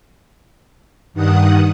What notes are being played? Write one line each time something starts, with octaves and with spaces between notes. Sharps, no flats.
G2 D#3 F#5 D#6